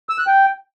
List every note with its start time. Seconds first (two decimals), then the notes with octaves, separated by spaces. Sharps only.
0.09 E6
0.18 F#6
0.27 G5